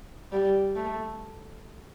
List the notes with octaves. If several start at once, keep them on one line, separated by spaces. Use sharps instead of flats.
G3
A3